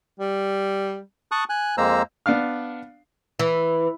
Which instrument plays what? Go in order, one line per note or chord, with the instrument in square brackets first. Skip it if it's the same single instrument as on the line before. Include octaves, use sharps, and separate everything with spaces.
[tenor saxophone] G3
[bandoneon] A5 C#6 D#6 F#6
G#5 F#6
F2 G#3 A#3 C5 A#5 E6
[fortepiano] B3 D4 F5 F6
[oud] E3